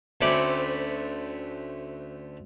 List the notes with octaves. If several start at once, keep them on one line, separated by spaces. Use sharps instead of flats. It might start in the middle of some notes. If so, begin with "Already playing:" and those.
D2 A3 C4 C#4 D5 B5